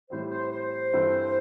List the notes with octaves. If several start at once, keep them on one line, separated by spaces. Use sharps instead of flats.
A2 E3 G3 C4 C5
C5
C5
G2 E3 C4 A4